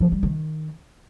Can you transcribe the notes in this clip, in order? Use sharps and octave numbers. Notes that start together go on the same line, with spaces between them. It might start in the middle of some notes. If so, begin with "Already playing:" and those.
F3
G3
D#3